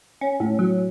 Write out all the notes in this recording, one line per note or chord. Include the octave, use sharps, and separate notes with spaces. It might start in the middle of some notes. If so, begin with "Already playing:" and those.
C#4
A2
F#3